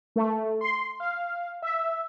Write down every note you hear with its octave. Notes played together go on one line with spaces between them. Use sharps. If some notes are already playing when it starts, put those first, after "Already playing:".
A3
C6
F5
E5